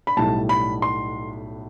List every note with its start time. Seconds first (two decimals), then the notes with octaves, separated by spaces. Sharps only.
0.07 B5
0.17 B1 A2 G3 A5
0.49 B5
0.82 C6